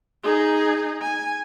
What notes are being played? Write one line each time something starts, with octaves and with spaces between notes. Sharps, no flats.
D#4 G#4
G#5